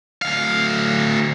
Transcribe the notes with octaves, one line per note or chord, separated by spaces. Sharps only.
D2 F5